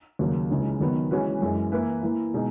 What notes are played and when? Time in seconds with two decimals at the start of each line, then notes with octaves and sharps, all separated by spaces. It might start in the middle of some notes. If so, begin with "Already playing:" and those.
0.19 D#2 C#3 F#3 A#3
0.50 C#2 C#3 E3 G#3 D#4
0.80 D#3 F#3 B3
1.11 E3 G#3 C#4 F#4 B4
1.42 F#2 E3 G#3
1.72 E3 A#3 E4 B4
2.02 E3 A#3 E4
2.34 B2 G#3 D#4